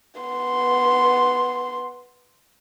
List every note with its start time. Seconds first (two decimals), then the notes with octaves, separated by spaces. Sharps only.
0.20 B3 C6